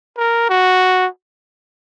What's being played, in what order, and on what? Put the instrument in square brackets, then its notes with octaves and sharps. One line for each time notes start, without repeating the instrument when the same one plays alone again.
[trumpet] A#4
F#4